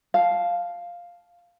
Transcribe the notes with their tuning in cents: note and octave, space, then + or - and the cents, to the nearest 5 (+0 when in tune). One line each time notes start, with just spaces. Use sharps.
F5 +0 A5 -20